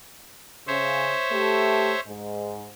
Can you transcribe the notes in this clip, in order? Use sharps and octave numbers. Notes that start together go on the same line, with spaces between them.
C#3 C5 C#5 E5
A3 G4
G#2